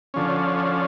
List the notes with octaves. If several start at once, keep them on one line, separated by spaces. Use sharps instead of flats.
D3 F3 C#4